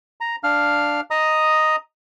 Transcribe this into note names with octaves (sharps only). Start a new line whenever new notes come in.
A#5
D4 F5 F6
D#5 A#5 D#6